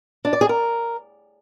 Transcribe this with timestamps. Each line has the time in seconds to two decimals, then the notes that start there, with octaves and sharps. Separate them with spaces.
0.25 D4
0.33 D5
0.41 G#4
0.49 A#4